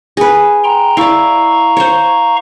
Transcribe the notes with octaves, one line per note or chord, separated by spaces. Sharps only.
G#4 B4
G5 A#5 C6
E4 D5 F5 A#5 C#6
C5 C#5